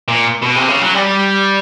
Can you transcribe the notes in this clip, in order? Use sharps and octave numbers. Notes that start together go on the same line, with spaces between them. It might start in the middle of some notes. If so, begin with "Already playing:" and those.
A#2
B2
C3
C#3
F#3
G3